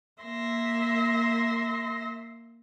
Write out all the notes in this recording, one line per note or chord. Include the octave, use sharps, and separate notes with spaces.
A#3 E5 C6 A#6